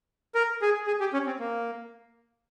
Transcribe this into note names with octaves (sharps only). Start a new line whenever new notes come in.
A#4
G#4
G#4
G4
C#4
C4
A#3